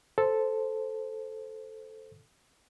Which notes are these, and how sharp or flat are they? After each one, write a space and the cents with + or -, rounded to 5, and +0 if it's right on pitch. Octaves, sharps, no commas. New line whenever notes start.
A4 -5 C5 +0